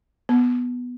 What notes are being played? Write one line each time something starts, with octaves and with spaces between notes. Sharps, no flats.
B3